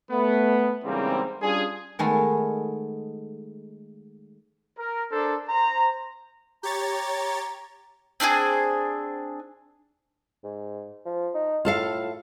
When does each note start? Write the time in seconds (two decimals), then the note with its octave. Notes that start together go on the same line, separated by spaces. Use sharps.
0.11 A3 B3
0.84 E2 G#2 C#3 G3 A#3 C4
1.42 G3 C#4 D4 F4 G#4
1.99 D#3 G#3 A3 B3
4.78 A#4
5.11 D4 A4 A#4 C5
5.48 C5 A#5
6.63 G4 C#5 A#5 A6
8.20 C4 D4 D#4 G#4
10.44 G#2
11.05 F3
11.35 D#4
11.65 A2 F4 A4 F5